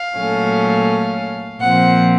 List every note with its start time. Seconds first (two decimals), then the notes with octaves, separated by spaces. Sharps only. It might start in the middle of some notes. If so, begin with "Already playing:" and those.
Already playing: F5
0.16 A#2 F#3 A3 C#4
1.61 A#2 F3 C4 F#5